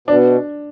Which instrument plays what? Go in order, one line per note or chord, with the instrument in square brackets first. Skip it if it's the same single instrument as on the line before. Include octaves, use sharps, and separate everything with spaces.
[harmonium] B2 [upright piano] D4